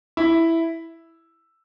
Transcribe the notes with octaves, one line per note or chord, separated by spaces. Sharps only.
E4